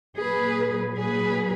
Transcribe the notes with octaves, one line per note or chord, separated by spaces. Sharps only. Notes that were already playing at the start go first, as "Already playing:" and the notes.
A#2 F#3 G#4 B4
G#4 B4